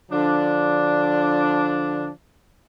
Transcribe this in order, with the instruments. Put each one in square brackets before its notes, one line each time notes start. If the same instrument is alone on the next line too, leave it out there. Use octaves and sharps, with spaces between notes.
[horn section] D3 F3 D4